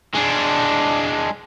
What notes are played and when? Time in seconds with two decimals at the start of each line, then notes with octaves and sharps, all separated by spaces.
0.15 G#3 D4